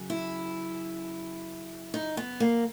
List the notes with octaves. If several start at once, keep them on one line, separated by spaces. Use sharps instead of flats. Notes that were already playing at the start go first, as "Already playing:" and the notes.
Already playing: F#2 C#3 F#3
E4
D#4
B3
A#3